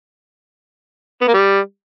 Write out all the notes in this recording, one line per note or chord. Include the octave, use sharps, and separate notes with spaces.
B3
A#3
G3